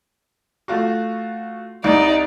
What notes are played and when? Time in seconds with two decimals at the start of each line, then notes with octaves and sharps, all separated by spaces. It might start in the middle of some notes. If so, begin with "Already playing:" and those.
0.68 A3 F4 F#4
1.84 C2 D#4 D5